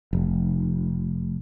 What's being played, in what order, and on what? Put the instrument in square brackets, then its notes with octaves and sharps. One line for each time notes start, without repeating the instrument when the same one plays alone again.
[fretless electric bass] F1